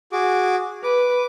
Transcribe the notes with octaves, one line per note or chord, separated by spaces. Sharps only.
F#4 G#4 D6
B4 D6